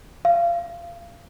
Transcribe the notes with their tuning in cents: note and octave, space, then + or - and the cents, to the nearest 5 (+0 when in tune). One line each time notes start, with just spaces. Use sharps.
F5 -25